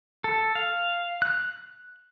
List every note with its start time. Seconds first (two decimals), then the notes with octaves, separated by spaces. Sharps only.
0.24 A4
0.55 F5
1.22 F#6